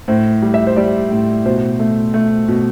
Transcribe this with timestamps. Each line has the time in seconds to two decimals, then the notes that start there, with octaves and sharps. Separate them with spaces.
0.08 A2 C5
0.42 G3
0.54 E5
0.67 C5
0.76 G3 D5
1.11 A2
1.46 B2 C5
1.80 A3
2.14 A3
2.48 B2